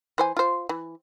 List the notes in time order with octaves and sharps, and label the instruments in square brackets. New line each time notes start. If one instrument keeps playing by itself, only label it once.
[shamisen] E3 C5 G#5
F4 C5
E3